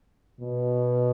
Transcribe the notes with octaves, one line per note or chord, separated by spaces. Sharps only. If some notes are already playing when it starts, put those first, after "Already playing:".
B2